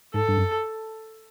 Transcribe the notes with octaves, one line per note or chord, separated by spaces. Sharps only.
G#2 A4
G2
F#2